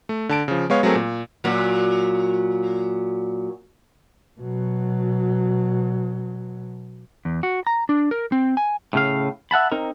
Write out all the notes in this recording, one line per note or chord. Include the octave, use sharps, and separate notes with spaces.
A3
D3 A5 D7
C#3 F3
G#3 B3 C#5 F5
F#3 A3 C4 G#4 A#4
A#2
A#2 F#3
B2 F#3
E2
F#4
A#5
D4
A#4
C4
G#5
A2 C#3 F5
E5 F#5 A5 B5
C4 D#4 A#4